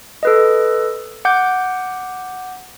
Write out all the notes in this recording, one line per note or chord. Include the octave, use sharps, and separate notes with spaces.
A4 B4 D#5
F#5 D6 G6